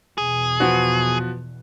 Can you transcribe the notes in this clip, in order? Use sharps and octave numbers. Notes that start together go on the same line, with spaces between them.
E2 B2 G#4
F3 B3 F#4